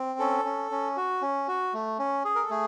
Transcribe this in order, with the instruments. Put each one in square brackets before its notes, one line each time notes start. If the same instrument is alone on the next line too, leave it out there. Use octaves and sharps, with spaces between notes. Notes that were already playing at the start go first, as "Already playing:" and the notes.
Already playing: [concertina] C4
C#4 A4
C#4
C#4
F#4
C#4
F#4
A3
C#4
G#4
A#4
A4
A3 G#4